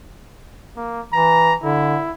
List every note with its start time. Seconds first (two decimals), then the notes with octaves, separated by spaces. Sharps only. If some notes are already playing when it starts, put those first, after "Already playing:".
0.76 A#3
1.13 E3 A#5
1.63 D3 E4